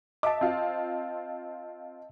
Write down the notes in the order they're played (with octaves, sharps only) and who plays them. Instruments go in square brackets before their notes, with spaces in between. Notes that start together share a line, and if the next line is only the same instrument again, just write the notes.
[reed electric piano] D#5 A5 [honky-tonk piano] E5 D6
[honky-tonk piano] C4 F4